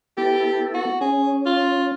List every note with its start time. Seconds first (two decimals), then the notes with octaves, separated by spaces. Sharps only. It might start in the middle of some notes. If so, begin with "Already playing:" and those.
0.17 B3 E4 G4 A4
0.74 F#4
1.01 C#4 G#4
1.46 F4